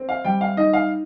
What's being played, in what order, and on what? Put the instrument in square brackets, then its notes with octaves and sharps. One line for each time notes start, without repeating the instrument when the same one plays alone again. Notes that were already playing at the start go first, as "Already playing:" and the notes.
Already playing: [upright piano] C4
F5
G3 G5
F5
D#4 D#5
F5